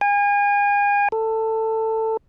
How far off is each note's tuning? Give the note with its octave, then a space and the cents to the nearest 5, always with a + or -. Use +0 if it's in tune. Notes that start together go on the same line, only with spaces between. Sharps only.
G#5 -35
A4 +15